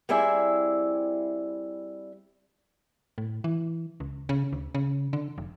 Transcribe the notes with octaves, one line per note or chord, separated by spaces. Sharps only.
G3 C4 E4 G#4 D5 E5
A2
E3
C#2
C#3
D2
C#3
D3
F1